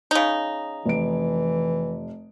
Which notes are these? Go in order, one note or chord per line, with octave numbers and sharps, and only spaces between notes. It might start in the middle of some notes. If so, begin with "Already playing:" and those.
C#3 D#4
F1 E3 D7